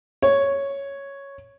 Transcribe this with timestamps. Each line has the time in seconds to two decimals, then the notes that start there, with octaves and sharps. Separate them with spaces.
0.22 C#5